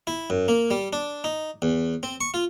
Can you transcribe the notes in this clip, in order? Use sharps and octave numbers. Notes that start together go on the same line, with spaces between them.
E4
F#2
A#3
G3
D4
D#4
E2
C4
C#6
F4